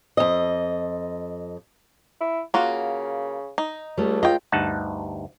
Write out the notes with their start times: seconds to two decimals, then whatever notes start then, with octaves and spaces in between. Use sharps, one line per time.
0.17 F2 D#5
2.21 E4
2.54 C#3 A#3 F4 F#4
3.58 D#4
3.98 C#2 G3 A3
4.23 F4 D#5 G5
4.52 D2 G2 D#4 F#5 A5